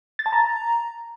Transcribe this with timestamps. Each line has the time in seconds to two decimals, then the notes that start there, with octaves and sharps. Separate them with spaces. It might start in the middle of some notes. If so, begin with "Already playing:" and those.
0.19 A6
0.26 A5
0.33 A#5